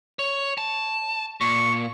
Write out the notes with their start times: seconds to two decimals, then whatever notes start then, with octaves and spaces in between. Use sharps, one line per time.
0.19 C#5
0.58 A5
1.41 A#2 C#6